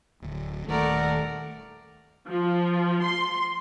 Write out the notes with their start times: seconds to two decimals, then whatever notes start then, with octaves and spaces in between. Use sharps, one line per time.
0.22 D1 D2
0.68 D#1 D#3 A3 A#4 D5 F#5
2.28 F3
3.02 C6